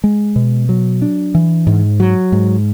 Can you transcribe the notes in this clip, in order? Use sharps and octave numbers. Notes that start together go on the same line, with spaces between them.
G#3
B2
F#3
D4
E3
G#2
F#3
G#2